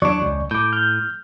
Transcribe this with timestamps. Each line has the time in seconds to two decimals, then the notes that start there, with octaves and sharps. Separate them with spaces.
0.02 E2 F#3 D4 D5 C#6
0.22 C#2
0.51 A2 D6 G6
0.72 F6 G6